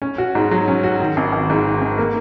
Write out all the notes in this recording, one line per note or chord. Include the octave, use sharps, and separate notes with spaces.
C#4
F#4
G#2
F#3
C#4
F#4
D#3
G#1
G#1
G#2
D#3
G#1
A#3